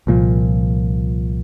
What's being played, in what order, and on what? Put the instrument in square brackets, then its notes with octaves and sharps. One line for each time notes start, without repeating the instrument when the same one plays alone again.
[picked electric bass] C2 A#2 F3